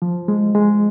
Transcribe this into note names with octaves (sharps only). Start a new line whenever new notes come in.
F3
G#3
G#3